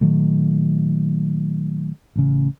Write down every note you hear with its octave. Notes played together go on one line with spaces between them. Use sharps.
A#2 D#3 F#3 A3
A1 C#3